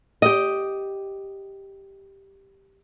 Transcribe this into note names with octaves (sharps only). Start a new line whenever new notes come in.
G4 D#5